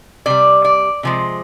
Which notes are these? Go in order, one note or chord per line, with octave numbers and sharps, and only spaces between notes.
C3 G3 D5
D5
C3 F3 G#3